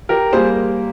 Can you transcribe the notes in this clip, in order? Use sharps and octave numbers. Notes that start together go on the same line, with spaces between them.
G4 A#4
G3 A#3 G#4 C5